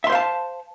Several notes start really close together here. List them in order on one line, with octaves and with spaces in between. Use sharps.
E5 C6 C5 F5 A5